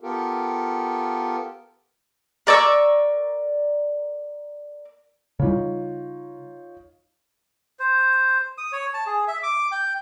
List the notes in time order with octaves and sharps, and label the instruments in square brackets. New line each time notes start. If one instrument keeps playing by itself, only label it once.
[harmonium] B3 F4 G4 A4 A#4
[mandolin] A#4 D5 C#6 E6
[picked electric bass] C#3 G3 [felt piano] D#4 F4 C#5
[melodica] C5
D#6
C#5
A5
G#4
E5
D6
G5